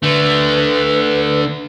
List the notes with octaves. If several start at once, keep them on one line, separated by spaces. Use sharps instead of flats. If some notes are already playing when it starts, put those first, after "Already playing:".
D3 A3 B4